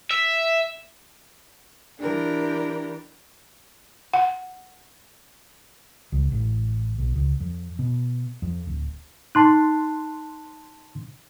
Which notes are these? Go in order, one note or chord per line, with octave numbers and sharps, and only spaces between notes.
E5
E3 D4 G4 A#4
F#5
C#2
A1
B1
C#2
F2
B2
F2
D1
D#4 A5 C6 F#6